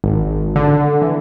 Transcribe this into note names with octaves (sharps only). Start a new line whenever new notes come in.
G#1
D3
E3